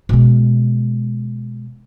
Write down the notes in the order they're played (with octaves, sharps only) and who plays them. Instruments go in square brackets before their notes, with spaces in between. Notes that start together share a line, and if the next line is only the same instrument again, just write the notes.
[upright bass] B2 G#3